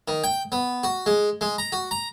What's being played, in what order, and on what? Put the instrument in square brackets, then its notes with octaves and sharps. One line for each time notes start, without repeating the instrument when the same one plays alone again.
[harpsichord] D#3
G5
B3
F#4
G#3
G#3
A#5
F#4
A#5